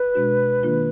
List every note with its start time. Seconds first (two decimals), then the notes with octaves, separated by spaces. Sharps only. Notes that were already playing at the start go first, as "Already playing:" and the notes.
Already playing: B4
0.15 B2 G#3 D4 F#4
0.63 D#3 A#3 D4 F4